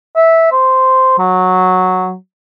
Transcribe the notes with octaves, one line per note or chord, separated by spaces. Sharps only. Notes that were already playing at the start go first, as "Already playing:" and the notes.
E5
C5
F#3